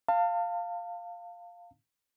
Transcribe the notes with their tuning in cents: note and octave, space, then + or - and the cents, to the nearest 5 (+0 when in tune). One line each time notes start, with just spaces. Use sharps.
F5 +0 A5 +35